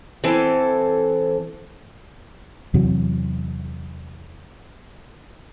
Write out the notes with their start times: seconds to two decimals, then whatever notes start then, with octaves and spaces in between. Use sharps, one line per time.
0.24 E3 C4 A4
2.74 E2 C3 E3 F#3